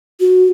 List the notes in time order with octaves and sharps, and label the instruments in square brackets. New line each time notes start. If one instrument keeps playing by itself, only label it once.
[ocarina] F#4